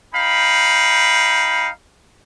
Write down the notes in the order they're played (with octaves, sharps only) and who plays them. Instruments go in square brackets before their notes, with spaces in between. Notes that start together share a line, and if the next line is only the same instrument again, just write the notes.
[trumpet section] D#4 F5 G5 B5